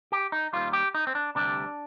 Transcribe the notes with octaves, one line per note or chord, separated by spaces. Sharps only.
G4
D#4
D#2 D#3 G3 F4
G4
D#4
C4
D4
D2 C3 G3 D4